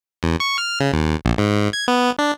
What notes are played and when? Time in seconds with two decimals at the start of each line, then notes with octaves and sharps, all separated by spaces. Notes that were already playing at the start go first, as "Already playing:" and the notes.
0.23 E2
0.40 C#6
0.58 F6
0.80 C#3
0.93 D#2
1.25 A#1
1.38 G#2
1.73 G#6
1.88 B3
2.19 D4